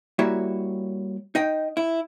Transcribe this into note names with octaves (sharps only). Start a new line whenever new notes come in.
G3 A#3 E4 F#4 C#5 E5
D#4 D#5 G5
E4